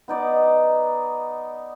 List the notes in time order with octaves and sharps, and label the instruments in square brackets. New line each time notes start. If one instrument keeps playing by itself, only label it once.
[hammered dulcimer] B3 D#4 D5